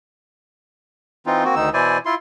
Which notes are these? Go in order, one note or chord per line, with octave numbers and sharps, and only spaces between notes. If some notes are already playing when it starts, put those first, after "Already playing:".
E3 C4 D#4 F4
A#3 C4 F#4
D2 D#3 D#4 E6
B2 E3 E4 C5 D5 G#5
E4 F4 C6